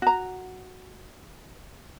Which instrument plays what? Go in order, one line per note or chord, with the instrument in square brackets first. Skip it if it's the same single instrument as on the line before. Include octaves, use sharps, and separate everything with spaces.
[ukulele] F#4 A#5